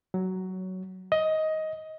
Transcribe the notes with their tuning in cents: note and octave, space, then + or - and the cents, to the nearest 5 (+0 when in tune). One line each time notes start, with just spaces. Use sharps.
F#3 +10
D#5 +15